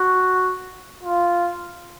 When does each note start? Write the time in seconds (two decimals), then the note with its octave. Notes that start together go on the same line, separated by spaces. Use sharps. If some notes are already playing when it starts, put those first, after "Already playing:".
Already playing: F#4
1.03 F4